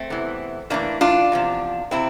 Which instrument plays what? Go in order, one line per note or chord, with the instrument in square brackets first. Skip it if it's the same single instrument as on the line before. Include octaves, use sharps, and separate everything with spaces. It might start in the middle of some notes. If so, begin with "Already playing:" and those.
Already playing: [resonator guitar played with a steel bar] A3 C4
E2 C3 E3
A2 E3 A#3 D4
D4 F4
E2 C3 F3
C3 C4 E4